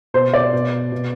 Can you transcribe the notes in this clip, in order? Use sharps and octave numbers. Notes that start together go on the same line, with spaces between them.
B2 C5
D5
B2
B2